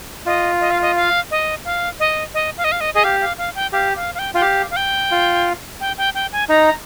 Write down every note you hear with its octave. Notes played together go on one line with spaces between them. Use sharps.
F4 D#5
D#5
F5
D#5
F5
D#5
F5
D#5
D#5
F5
D#5
F5
D#5
G#4 D#5
G4 F5
F5
F5
G5
G4 F5
F5
F5
G5
F4 G5
G4 F5
F5
G5
F4
G5
G5
G5
G#5
D#4 A#5